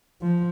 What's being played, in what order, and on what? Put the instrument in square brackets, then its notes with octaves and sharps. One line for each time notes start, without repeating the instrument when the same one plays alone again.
[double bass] F3